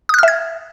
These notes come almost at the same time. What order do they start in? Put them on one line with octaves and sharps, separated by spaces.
D#6 F#6 F6 E5 G#6